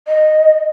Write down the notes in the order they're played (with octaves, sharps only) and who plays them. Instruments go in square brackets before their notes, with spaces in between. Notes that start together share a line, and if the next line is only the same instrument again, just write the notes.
[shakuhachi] D#5